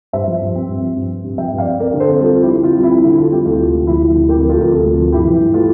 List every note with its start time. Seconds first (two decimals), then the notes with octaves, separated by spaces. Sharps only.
0.13 G2 C5 E5
0.28 F3
0.41 G2
0.55 C4
0.69 G2
0.82 F3
0.96 G2
1.10 C4
1.24 G2
1.38 F3 E5 G5
1.52 G2
1.58 D5 F5
1.66 C4
1.79 C4 A#4 D5
1.94 D3
2.00 A4 C5
2.08 F2
2.21 G3 F4 A4
2.36 C4
2.43 E4 G4
2.49 D3
2.62 F2 F4
2.77 G3
2.83 E4
2.91 C4
3.04 D3 F4
3.18 F2 F4 A4
3.32 G3 E4 G4
3.45 D2 F4 A4
3.60 C3
3.74 D2
3.87 F3 E4 G4
4.01 D2
4.15 C3
4.29 D2 G4 A#4
4.43 F3 A#4
4.49 F4 A4
4.57 D2 A#4
4.70 C3 F4 A4
4.85 D2
4.99 F3
5.12 G2 E4 G4
5.26 E3
5.40 G2
5.54 A3 F4